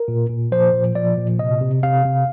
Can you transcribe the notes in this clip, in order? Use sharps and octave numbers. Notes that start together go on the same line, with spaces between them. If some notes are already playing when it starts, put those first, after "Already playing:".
Already playing: A#4
A#2
A#2
F3 C5
A#2
F3 D5
A#2
C3 D#5
C3
C3 F5
C3